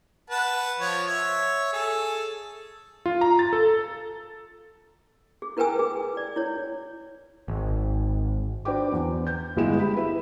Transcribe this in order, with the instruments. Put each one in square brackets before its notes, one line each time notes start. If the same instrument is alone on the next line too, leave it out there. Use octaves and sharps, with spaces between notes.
[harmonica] B4 F#5 A5
F3 C#5
C#5 E5
G#4 A4
[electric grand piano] F4
A#5
A6
A4
[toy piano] G#4
E4 A#4 B4 G5 G#5 E6
G#4
D5
E4 C#5
[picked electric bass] G#1
[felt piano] D4 F#4 B4 C5 G5 D6
E2
G6
G1 G#3 E4 E7
G4 B5
E4 B4 E5